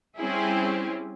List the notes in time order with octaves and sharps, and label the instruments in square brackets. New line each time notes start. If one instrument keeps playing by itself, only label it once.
[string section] G3 C4 C#4 E4 G4 G#4